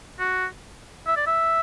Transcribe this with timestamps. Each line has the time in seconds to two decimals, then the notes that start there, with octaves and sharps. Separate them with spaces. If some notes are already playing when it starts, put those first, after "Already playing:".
0.20 F#4
1.07 E5
1.17 D5
1.27 E5